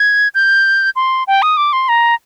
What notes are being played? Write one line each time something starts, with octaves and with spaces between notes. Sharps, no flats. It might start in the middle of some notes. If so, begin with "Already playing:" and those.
Already playing: G#6
G6
C6
G5
D#6
D6
C6
A#5